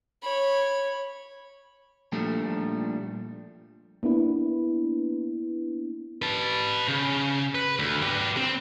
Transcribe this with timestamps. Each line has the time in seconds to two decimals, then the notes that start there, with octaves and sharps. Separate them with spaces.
0.23 C#5 B5
2.12 A#2 F3 G3 A3 D4
4.03 A#3 B3 D4 E4 B4
6.22 B4 A5
6.88 C#3
7.55 B4
7.79 D2
8.03 G4 B4
8.37 C4